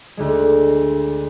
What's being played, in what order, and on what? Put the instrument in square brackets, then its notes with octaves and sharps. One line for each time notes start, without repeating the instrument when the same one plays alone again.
[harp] D2 D3 G#3